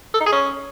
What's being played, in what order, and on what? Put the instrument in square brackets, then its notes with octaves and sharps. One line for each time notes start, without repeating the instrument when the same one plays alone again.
[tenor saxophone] A4
D#4
G#4
C#4